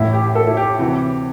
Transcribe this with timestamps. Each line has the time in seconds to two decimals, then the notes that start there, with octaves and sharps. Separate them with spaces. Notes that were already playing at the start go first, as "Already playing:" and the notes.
Already playing: A1 A2 E3 E4
0.13 G4
0.35 A4
0.47 E4
0.57 G4
0.79 D2 C3 E3